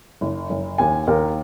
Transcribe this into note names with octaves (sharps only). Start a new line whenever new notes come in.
F#1
F#1
D#2 G#5
D#2 A#4